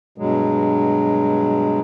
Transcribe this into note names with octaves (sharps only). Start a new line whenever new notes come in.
G2 B2 F#3 G#3